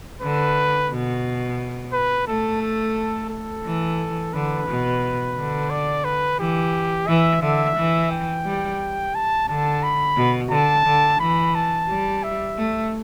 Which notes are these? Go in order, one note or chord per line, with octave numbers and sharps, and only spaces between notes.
D3 B4
B2
B4
A3 A4
A4
A4
E3
D3 B4
B2
D3
D5
B4
E3 G4
E3 E5
D3 E5
E3
G5
G3
A5
D3 A5
B5
B2
D3 A5
D3
E3 B5
A5
G3
E5
A3